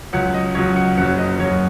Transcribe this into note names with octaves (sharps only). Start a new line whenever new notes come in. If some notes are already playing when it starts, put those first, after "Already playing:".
C#2 C#3 F#3 F#5
D#5
C#2 C#3 F#3 C#5
F#5
F#1 F#2 C#3 F#3 F#5
D#5
F#1 F#2 C#3 F#3 C#5